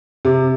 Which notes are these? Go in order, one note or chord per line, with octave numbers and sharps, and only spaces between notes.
C3